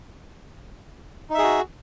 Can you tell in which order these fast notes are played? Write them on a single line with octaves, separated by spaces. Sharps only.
D#4 E5 G#4 F#4